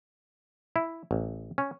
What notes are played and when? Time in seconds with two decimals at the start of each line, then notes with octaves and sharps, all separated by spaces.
0.76 E4
1.11 A1
1.58 C#4